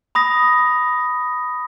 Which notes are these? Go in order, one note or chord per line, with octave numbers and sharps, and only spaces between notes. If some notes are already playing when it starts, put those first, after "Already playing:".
B5 D#6 A#6